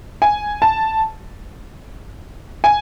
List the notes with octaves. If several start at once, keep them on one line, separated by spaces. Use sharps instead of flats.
G#5
A5
G#5